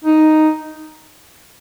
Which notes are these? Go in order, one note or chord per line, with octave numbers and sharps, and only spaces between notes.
D#4